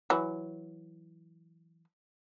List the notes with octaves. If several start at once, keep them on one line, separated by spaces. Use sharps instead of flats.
E3 F#3